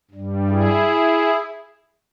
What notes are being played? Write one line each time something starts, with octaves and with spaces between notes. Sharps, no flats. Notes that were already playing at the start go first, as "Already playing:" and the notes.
G2 G3
E4 G#4